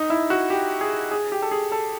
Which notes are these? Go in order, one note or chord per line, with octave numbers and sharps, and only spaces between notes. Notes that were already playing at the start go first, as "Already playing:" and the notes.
Already playing: D#4
E4
F#4
G4
G#4
G#4
G4
A4
G#4
A4